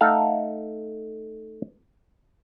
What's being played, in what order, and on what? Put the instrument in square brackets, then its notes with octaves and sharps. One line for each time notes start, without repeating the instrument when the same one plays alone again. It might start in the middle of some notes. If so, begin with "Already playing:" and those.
[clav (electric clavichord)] A3 D#4 A4 F5 F#5